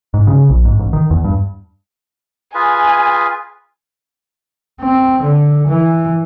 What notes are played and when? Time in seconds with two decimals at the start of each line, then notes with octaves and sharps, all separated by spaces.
0.14 G#2
0.27 C#3
0.50 A#1
0.65 G#2
0.79 A1
0.93 D#3
1.11 E2
1.24 G2
2.54 F4 G#4 B4 G#5
4.81 C4
5.22 D3
5.67 E3